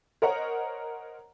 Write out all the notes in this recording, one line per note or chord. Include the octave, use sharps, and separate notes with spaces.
A#4 C5 C#5 D#5 F#5 A#5